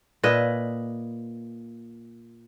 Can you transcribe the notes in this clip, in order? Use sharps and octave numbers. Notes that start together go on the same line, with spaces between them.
A#2 B4 D#5 E5